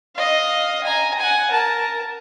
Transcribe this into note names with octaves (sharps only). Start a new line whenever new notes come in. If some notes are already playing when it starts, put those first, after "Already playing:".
D#5 F5
G#5 A#5
F#5 G#5
A#4 A5